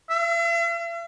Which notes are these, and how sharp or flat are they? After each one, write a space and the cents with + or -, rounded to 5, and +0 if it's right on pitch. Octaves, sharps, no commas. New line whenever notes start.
E5 +45